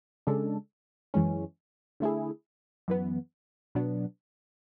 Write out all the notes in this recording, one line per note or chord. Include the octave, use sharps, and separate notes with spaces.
C#3 G#3 D4 A4
F#2 E3 G#3 C#4
D3 A3 E4 G#4
F#2 E3 B3
B2 F#3 B3 D4